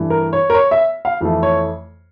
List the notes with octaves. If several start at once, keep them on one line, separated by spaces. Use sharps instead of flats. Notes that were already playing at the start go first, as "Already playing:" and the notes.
Already playing: G2 E3 A3
A#4
C#5
A#4
C#5
E5
F5
F2 E3 A3
C#5